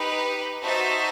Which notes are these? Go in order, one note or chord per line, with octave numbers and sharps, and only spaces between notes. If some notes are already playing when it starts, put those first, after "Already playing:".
Already playing: D#4 G4 B4
D#4 F#4 C5 E5 A5